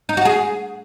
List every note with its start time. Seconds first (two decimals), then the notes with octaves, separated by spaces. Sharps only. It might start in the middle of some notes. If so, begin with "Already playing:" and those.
0.09 D#4
0.17 F#4
0.25 G#4